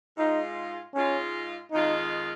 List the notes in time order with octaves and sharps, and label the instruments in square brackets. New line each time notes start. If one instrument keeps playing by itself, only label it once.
[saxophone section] G#2 G#3 F4 [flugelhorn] D#4
[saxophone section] G#2 G#3 F4 [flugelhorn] C#4
[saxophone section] F2 D#3 G#3 F4 [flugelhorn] D#4